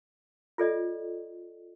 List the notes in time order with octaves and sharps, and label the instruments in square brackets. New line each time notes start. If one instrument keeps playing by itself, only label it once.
[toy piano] F4 A4 D5 D#5